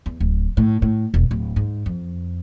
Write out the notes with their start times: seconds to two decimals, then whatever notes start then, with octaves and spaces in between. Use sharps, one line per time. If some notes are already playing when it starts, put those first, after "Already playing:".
0.06 E2
0.20 D1
0.57 A2
0.82 A2
1.14 E1
1.31 D1
1.56 G#2
1.86 F2